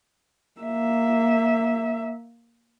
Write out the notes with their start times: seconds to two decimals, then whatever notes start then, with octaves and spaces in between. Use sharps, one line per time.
0.61 A#3 E5